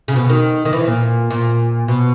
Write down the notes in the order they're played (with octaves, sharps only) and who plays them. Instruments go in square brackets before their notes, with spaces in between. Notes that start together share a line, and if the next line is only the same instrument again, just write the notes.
[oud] C#3
B2
D#3
D#3
E3
A#2
A#2
B2